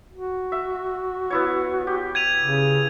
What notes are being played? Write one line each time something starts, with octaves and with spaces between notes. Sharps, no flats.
F#4
E5
B3 E4 C#5
G4
G#6 D#7 F7
C#3